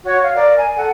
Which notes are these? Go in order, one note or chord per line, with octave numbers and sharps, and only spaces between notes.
F#4 C#5
F5
A#4 D5
G#5
A4 F#5